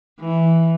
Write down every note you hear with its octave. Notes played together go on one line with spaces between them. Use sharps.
E3